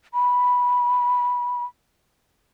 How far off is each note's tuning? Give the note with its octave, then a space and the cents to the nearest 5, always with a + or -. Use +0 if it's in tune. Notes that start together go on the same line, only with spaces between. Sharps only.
B5 -10